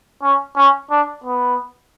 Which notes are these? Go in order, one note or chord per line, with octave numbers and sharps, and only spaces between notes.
C#4
C#4
D4
B3